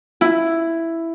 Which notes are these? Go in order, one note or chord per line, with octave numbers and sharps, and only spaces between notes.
E4